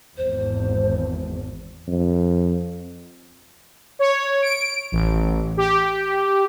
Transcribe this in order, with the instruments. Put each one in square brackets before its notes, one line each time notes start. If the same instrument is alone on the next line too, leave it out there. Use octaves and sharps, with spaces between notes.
[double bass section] G#1 E2 [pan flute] C5
[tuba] F2
[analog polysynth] C#5
D7
A1
G4